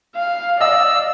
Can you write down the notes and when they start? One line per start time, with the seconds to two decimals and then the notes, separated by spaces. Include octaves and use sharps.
0.16 F5
0.61 D5 D#5 F5 E6